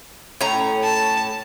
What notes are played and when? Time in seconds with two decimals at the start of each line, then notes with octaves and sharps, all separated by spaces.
0.41 A2 C#4 A#5
0.83 A5